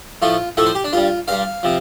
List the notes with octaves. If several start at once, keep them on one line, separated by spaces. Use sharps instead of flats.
A2 F3 A3 F4
A2 F3 A3 A4
C5
G4
D4
G2 G3 F4
G2 G3 F5
C3 F3